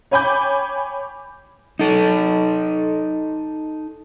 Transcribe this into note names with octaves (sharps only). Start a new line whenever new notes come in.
C#5 G5 G#5 B5 D6 G6
D#4 A4